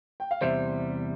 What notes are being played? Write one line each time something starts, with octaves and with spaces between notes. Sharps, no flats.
G5
F5
E2 C3 G3 C5 E5